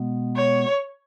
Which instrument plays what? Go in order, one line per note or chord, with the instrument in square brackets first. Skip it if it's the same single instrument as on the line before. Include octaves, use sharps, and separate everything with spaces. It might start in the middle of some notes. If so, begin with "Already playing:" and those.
Already playing: [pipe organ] B2 G#3 B3
[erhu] C#5